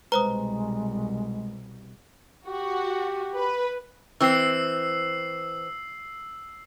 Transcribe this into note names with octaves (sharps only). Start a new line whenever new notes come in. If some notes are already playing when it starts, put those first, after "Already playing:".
C2 B2 G#3 B4 C5 A#5 D#6
F#4 G4
B4
E3 C4 E6 C7